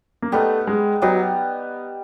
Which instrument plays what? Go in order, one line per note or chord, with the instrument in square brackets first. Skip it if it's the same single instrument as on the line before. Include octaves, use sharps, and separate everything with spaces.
[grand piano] A#3
[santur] G3 B3 D#4 [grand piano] A3
[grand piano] G#3
[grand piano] F#3 [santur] G3 B3 D#4